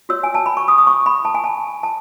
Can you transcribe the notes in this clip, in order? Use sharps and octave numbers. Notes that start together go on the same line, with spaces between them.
F#4 C#5 E6
G#5
A5
B5
C#6
D#6
D#6
C#6
B5
A5
G#5
A5
A5